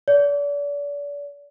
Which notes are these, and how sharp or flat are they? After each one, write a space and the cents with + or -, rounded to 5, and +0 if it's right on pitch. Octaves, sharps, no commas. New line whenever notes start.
D5 -35